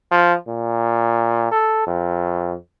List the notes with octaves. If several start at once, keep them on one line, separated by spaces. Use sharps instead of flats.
F3
A#2
A4
F2